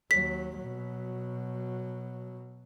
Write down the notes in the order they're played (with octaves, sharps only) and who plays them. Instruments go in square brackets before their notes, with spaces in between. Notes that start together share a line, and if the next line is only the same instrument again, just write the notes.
[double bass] D#2 F#3 [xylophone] B6
[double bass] B2 F#3